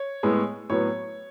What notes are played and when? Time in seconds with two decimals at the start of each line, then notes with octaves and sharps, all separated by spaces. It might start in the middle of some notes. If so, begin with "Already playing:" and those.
Already playing: C#5
0.23 A2 G#3 B3
0.70 A2 F#3 B3 C#5